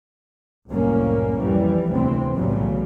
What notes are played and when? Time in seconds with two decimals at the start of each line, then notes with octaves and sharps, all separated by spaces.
0.69 C2 F#2 A2 A#3 C#4
1.38 F2 E3 G3
1.89 D2 C3 E3 C4
2.34 B1 A2 C#3 E3 F#3 G3